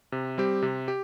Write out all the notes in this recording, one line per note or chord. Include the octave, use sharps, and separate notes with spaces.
C3
G3 C4 G4
C3
G4